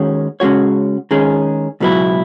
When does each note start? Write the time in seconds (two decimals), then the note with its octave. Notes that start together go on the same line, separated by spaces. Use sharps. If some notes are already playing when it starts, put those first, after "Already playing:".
Already playing: D#2 D#3 G#3 C#4 F#4
0.40 C#3 G#3 C#4 F#4 C#5
1.11 D#3 G#3 C#4 G#4
1.80 C#2 B2 F#3 B3 E4